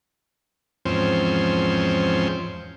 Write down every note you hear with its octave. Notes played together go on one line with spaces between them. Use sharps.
E2 G#2 F3 C4 C#4 C5